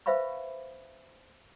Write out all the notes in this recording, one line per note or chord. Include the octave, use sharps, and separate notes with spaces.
B4 C5 E5 F5 B5 C#6